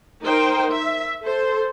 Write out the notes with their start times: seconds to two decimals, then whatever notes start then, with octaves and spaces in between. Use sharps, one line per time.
0.23 D#4 A#4 C5 G5
0.71 E5
1.23 A4 C5